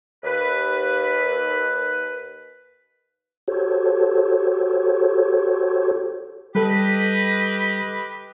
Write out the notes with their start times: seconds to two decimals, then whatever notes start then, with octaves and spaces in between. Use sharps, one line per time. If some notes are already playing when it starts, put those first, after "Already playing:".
0.24 D#2 B4
3.48 F#4 G4 A4 C5 C#5
6.55 G3 G4 A4 B4 D#5